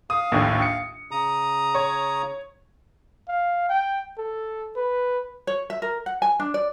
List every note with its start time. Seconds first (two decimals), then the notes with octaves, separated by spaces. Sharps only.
0.10 F5 D#6
0.32 A#1 D#2 A2
0.62 C#7
1.11 C#3 A#5 D#6
1.75 C#5
3.28 F5
3.69 G5
4.18 A4
4.76 B4
5.47 C#5
5.70 E5
5.82 A#4
6.06 F#5
6.22 G#5
6.40 D4
6.54 D5